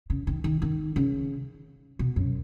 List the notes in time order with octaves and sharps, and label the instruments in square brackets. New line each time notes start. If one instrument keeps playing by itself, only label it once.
[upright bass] C#3
D#3
D#3
D#3
C#3
B2
F#2